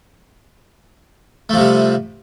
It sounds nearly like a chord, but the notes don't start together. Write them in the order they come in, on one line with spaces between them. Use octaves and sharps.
A3 F3 C3 G3